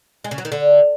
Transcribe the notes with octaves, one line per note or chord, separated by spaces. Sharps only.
G#3
C#3
F#3
D#3
D3